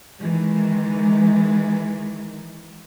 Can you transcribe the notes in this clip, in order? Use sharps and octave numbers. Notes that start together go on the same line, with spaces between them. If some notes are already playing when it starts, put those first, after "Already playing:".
D#3 E3 G#3